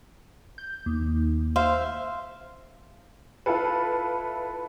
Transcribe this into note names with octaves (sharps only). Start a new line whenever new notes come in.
G6
D#2
C5 E5 F5
E4 F4 A4 B4